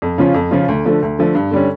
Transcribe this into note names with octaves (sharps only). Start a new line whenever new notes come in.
F2
C#3 F3 C#4 F4
F2
C#3 F3 C#4 F4
D2
D3 F3 A3
D2
D3 F3 A3
G2
D3 G3 C#4